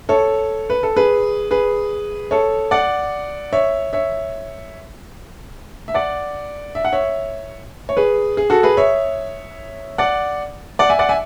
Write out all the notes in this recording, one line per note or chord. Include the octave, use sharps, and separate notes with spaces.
A4 C#5
B4
A4
G#4 B4
G#4 B4
A4 C#5
D5 F#5
C#5 E5
C#5 E5
E5
D5 F#5
E5
F#5
C#5 E5
C#5
G#4 B4
G#4
F#4 A4
G#4 B4
C#5 E5
D5 F#5
D5 F#5
E5 G#5
D5 F#5
E5 G#5